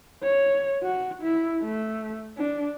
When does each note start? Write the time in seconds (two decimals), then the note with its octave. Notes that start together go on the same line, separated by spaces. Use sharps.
0.23 C#5
0.83 F#4
1.22 E4
1.62 A3
2.38 D4